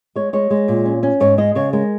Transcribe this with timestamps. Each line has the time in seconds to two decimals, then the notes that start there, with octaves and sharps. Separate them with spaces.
0.16 G#3 C#5
0.33 G#3 C#5
0.50 G#3
0.68 A#2
0.85 C#4
1.03 C#4
1.20 G#2 C#5
1.38 G#3 D#5
1.55 C#3 C#5
1.73 G#3 A#4